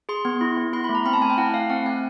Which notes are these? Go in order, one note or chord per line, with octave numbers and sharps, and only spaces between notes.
G#4 C6
B3 C6
E4
B3
E4 C6
B5
A3
A#5
C4 B5
A5
A3 G#5
G5
E4 F#5
A3 F5
C4 F#5
A3 G#5